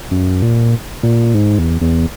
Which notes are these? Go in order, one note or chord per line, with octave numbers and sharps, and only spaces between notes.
F#2
A#2
A#2
G#2
E2
E2